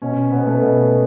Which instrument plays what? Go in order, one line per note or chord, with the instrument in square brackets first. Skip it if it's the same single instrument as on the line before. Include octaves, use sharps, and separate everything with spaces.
[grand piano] B2 C#4
B2 B3
A3
B2